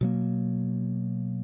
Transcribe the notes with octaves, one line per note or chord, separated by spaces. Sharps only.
B2 F#3 A#3